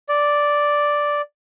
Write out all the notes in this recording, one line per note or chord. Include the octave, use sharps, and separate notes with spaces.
D5